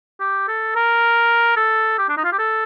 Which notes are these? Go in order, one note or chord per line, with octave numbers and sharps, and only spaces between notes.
G4
A4
A#4
A4
G4
D4
D#4
F4
G4
A4